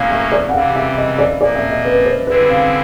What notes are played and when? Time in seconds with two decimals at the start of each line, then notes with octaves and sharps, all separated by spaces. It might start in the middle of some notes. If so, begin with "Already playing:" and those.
Already playing: A2 F#3 A#3 C#4 F5
0.11 E5
0.32 D5
0.48 F#5
0.53 C3 E3 G3 F5
0.75 E5
0.97 D#5
1.19 D5
1.41 A#2 F3 A#3 D5
1.55 E5
1.70 D#5
1.85 B4
2.05 C5
2.27 D3 G3 C4 E4 G#4 B4
2.50 F5